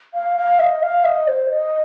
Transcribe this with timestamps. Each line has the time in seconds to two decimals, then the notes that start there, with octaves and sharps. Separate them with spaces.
0.14 F5
0.37 F5
0.59 D#5
0.82 F5
1.05 D#5
1.27 C5
1.50 D#5